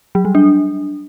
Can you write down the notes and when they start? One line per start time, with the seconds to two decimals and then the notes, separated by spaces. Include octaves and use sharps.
0.15 F#3
0.25 G3
0.35 D4